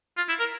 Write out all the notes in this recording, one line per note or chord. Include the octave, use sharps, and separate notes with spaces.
F4
E4
A#4